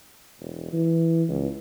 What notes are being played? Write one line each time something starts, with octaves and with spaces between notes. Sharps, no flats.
E1
E3
C#2